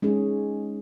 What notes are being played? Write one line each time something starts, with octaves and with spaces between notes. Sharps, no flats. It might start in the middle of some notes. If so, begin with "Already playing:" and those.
G#3 C#4 D#4 G#4